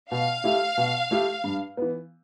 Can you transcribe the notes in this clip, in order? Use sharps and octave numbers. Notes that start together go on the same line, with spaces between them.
B2 F5
A3 E4 G4
B2
A3 E4 G4
G2
E3 B3